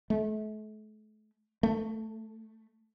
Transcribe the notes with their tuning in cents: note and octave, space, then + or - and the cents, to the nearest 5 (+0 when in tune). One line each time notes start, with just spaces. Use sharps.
A3 -40
A3 +5